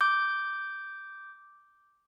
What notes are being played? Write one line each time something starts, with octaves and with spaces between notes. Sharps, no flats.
D6 G6